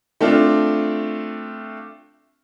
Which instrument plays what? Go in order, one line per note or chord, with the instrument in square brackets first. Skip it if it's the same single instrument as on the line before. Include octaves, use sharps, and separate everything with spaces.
[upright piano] A3 C4 D4 F4